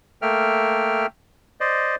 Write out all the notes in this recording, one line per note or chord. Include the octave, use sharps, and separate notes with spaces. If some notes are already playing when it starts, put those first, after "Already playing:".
A3 A#3 E5 G5 F6
C5 D5 D#5